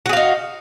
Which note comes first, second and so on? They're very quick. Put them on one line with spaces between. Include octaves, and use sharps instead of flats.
F#4 G#4 F5 D#4